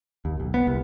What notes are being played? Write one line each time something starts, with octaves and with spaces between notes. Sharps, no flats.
D#2
B1
B3
C2